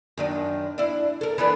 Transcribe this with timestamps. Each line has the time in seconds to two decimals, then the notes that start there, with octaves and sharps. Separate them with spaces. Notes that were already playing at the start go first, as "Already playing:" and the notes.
0.17 F#2 D#3 D4
0.78 D4 E4
1.21 A4 A#4
1.38 E3 B3 D4